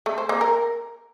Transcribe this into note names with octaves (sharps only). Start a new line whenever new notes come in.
A3
C5
A#3
A#4